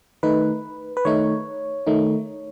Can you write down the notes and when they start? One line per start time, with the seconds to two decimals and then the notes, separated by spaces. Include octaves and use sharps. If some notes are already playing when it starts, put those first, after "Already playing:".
0.23 D#3 A3 D#4 B4
0.97 B4
1.05 D#3 A3 D#4 C#5
1.87 D#3 A3 D#4